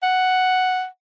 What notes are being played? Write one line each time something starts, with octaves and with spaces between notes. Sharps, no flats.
F#5